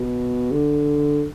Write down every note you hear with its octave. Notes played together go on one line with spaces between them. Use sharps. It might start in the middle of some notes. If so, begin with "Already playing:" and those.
Already playing: B2
D3